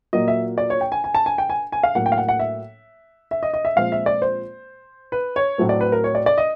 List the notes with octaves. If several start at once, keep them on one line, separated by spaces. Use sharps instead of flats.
A#2 F#3 A#3 D#5
E5
D5
C#5
G5
G#5
G#5
A5
G#5
G5
G#5
G#5
F5
A2 F#3 A#3 F#5
G5
F5
F#5
F#5
E5
E5
D#5
D#5
E5
A#2 F3 G#3 C4 F5
E5
D5
C5
B4
C#5
A2 F#3 A3 C4
D5
B4
A#4
C#5
D5
D5
D#5